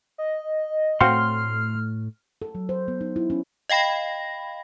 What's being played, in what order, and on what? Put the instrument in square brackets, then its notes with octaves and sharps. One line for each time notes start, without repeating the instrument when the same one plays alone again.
[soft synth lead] D#5
[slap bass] A2 A3 [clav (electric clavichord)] C4 F#4 F5 [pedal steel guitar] C6 [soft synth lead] F6
[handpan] A4
F#3
C5
B3
D#4
E4
C#4
[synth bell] D#5 F5 G5 B5 A#6